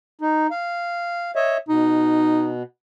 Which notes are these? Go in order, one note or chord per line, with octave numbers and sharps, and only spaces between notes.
D#4
F5
C#5 D#5 E5
B2 D#4